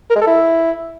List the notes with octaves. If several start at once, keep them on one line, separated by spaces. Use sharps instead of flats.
A#4
G#3
A4
E4